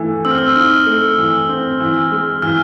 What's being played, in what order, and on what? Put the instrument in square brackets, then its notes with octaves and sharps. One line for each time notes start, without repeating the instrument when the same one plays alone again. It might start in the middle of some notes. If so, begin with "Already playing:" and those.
Already playing: [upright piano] E3 A3
[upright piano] C4 [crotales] E6
[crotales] F6
E6
[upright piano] D#4 [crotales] F6
[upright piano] A3
E3
C4
E3
G#3
[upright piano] E3 [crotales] F6